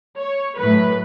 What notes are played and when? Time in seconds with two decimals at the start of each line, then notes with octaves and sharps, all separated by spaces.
0.18 C#5
0.57 A2 F#3 B4